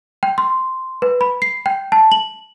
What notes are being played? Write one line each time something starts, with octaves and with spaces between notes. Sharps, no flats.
G5
C6
B4
B5
C7
G5
A5
F#7